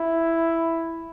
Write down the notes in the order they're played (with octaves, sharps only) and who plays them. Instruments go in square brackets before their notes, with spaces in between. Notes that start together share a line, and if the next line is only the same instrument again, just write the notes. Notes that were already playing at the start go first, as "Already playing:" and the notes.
Already playing: [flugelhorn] E4